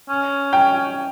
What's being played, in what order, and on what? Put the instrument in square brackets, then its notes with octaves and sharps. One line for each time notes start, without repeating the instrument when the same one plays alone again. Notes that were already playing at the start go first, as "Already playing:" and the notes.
[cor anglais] C#4
[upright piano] G5